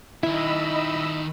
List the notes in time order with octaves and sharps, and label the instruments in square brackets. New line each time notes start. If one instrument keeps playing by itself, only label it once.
[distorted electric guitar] D#3 E5 [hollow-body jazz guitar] E4 [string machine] D#5 B5 E6